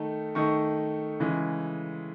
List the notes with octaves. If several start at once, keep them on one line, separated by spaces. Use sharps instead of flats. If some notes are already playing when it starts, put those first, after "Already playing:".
Already playing: D#3 A3 D#4
D#3 A3 D#4 C#6
C#3 E3 G#3